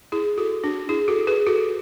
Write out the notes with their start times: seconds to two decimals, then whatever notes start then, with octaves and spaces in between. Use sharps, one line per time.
0.12 E4 G#4
0.38 F#4 A4
0.64 D4 F#4
0.89 E4 G#4
1.08 F#4 A4
1.27 G#4 B4
1.46 F#4 A4